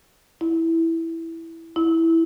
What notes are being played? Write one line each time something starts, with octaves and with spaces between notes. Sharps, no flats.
E4
E4